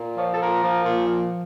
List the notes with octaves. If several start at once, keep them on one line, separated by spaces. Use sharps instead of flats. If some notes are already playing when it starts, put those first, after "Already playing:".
Already playing: A#2
F3 C#5
A4
A#2 A#4
F3
A#2
F3